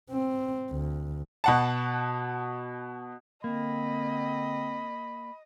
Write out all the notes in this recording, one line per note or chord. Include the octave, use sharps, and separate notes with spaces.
C4
D2
B2 F#5 A5
D3 A#3 C4 D#5 B5